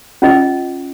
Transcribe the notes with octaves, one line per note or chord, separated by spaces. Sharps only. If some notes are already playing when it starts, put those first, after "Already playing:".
C#4 F4 D#5